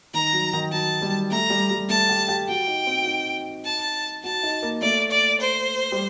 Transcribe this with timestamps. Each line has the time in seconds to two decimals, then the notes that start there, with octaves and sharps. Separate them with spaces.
0.14 D#3 A#5
0.33 F#3
0.53 D#3
0.72 F#3 A5
1.02 G3
1.31 A3 A#5
1.50 G3
1.70 G3
1.89 A3 A5
2.09 G4
2.28 G4
2.48 F#4 G5
2.67 D#4
2.87 C4
3.02 F#4
3.06 D#4
3.65 A5
4.23 F#4 A5
4.43 D#4
4.63 A#3
4.82 A3 D5
5.11 D5
5.40 C5
5.92 G3